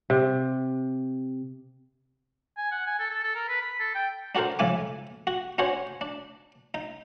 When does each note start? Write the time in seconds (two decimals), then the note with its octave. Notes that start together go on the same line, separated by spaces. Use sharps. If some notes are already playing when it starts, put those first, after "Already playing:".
0.10 C3
2.57 G#5
2.71 F#5
2.87 G#5
2.99 A4
3.11 A4
3.24 A4
3.35 A#4
3.48 B4
3.61 B5
3.80 A4
3.95 G5
4.35 D4 F#4 A4 A#4 C5
4.59 F2 G#2 C#3 E5 G#5 D6
5.27 F#4
5.58 C#4 D4 F#4 C5 C#5
6.01 D4
6.74 D#4